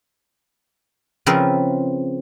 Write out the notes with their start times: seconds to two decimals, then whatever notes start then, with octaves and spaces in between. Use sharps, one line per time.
1.26 C#3 F3 C4 A#4 B4 E5